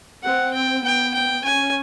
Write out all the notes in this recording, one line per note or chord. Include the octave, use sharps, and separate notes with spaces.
C4 F#5
G5
B3 G5
G5
C#4 G#5